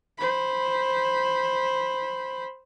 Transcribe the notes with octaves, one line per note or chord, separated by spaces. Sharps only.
C5 B5